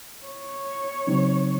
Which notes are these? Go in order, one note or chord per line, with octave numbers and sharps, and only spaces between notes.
C#5
C#3 F#3 C4 D#4